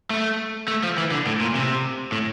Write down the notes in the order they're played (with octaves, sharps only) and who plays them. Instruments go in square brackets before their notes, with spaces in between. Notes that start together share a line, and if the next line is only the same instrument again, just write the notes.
[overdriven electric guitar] A3
A3
F3
E3
D3
A2
A#2
C3
A2